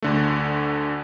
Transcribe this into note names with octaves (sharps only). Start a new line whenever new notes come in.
D2 D3 A3